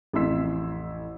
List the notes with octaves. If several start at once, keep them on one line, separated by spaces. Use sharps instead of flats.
A1 F2 E5 C6 E6 B6